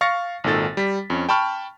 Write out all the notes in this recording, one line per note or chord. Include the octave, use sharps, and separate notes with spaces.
F5 C#6 F6 A6 A#6 C#7
G#1 A#2 D#3 A4 A6
G3 B6
F2 C#4
G5 A5 B5 C#6 F6